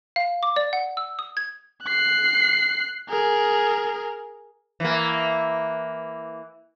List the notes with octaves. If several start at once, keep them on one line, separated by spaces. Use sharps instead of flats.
F5
D6
D5
F#5
E6
D#6
G#6
F#6 C7
G#4 A#4
E3 A#3